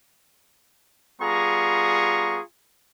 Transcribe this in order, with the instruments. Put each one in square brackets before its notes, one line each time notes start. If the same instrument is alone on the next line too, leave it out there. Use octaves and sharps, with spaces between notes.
[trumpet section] G3 B3 F4 G#4 A#5 C#6